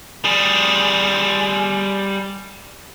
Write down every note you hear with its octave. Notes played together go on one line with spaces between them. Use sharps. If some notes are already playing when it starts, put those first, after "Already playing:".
G3 G#4